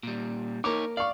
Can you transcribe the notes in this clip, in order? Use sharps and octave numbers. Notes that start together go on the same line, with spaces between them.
A#2 G3
A#3 D#4 C#5 D6
D5 F5 C#6